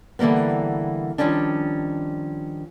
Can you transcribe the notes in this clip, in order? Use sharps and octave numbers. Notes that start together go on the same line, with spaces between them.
D3 E3 G3 A#3 B3
D#3 F3 G3 C#4 D4